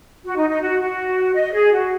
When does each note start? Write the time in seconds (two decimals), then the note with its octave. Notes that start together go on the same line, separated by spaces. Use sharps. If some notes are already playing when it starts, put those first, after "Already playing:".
0.24 F#4
0.36 D#4
0.48 D#4
0.60 F#4
0.79 F#4
1.34 D#5
1.52 G#4
1.71 F#4